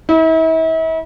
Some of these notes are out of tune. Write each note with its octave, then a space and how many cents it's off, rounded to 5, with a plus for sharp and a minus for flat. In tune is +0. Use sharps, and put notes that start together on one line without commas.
E4 -40